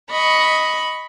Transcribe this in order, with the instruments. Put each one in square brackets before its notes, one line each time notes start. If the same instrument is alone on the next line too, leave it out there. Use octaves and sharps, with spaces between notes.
[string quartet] D#5 B5 C#6